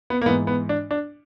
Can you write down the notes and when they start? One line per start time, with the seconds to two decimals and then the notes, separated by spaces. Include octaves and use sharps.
0.10 B3
0.22 A#3
0.26 G#2 E3 B3
0.47 B3
0.69 D4
0.91 D4